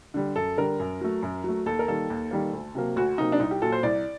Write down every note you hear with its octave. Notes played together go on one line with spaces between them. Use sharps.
D3 G3
F#2 A4
D3 G3 A#4
F#2
F#3 A3
F#2
F#3 A3
D#2 A4
A#4
D#3 G3 A#3 A4
D#2
D#3 G3 A#3
D2
C3 F#3 A#3
D2 F#4
C3 F#3 A#3 D#4
D4
C2 D#4
G4
A#2 F#3 A4
C5
C2 D5